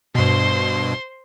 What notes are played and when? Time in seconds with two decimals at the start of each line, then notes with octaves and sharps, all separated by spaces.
0.15 G2 B2 C5 C6